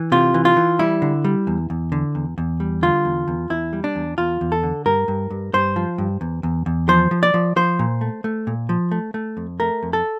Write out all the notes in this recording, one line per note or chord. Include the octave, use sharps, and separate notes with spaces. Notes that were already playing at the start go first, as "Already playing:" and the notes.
Already playing: E3
C3 F4
E3
F4
E3
G3 E4
D3
G3
E2
E2
D3
E2
E2
G3
D3 F4
E2
E2
E2 E4
G3
D4
E2
E2 F4
E2
A4
D3
G2 A#4
G2
G2
G2 C5
F3
G2
E2
E2
E2
F3 C5
F3
D5
F3
F3 C5
A#2
A3
A3
A#2
F3
A3
A3
F2
A3 A#4
F2
A4